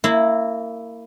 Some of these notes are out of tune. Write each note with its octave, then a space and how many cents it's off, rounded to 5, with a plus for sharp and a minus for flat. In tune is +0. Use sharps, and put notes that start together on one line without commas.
A#3 -20 E4 +0